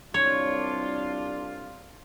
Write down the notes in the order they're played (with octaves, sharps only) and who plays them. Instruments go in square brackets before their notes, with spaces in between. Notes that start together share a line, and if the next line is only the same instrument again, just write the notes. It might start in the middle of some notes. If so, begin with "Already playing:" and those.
[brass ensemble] C2 D4 F4 [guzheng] C#5